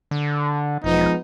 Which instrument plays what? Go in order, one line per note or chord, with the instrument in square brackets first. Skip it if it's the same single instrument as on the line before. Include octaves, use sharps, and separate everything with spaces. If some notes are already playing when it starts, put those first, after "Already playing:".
[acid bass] D3
[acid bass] E1 [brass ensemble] F3 G#3 B3 [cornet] D#4